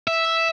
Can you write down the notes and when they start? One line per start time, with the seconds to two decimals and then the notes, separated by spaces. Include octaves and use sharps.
0.08 E5